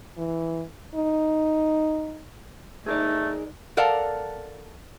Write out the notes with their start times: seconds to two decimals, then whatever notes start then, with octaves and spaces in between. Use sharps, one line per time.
0.17 E3
0.95 D#4
2.86 A3 D#4 G#4 A#4 D5
3.77 A4 A#4 D5 F5 F#5 A5